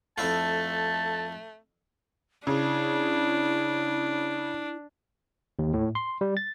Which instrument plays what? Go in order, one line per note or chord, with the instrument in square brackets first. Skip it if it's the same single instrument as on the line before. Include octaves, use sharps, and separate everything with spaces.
[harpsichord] F2 E4 F4 [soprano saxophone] A3 [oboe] A5
[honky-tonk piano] C#3 [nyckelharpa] D4 [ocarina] E4
[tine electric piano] D#2
A2
C6
G3
A6